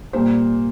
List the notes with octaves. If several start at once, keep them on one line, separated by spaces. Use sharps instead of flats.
A#2 G3 A#3 C5